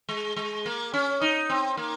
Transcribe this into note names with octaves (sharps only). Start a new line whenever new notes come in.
G#3
G#3
A#3
C#4
D#4
C4
A#3